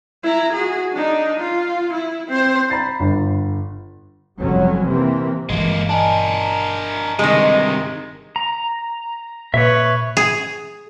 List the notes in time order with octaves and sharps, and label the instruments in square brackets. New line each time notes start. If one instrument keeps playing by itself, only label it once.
[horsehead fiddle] E4 A#5
F#4 G#4
D4 D#4
F4
E4
C4 C5
[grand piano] A#5 B5 A6 C7
G1
[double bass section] F1 F#3 G3 C#4
C3 E3 A#3 C4
[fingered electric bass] G1 E3 [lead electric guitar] G#3 A#3
[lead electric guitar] D4 A#4 [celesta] D#5 G#5 A5
[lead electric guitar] G2 C3 [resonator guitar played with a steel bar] D#3 G#3
[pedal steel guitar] A#5
[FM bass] A#2 [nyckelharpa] B4 C#5 [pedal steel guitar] E5 C#6
[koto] G#4